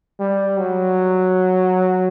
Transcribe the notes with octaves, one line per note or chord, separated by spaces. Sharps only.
G3
F#3